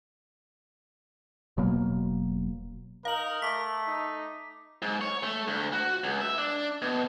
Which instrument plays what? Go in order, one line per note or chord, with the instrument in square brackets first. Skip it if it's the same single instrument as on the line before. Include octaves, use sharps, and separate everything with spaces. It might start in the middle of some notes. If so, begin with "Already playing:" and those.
[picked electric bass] E1 B2 F#3 A#3
[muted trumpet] D#4 [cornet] A#4 [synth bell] F5 F#7
[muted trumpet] A3 [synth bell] D6 B6
[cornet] D#4
[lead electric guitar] G#2
C#5
A3
D2
F#4
C#2
E5
D4
B2